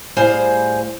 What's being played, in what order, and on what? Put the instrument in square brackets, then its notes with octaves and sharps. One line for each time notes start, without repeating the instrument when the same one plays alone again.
[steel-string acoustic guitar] A2 G3 G#4 C5 F5 G#5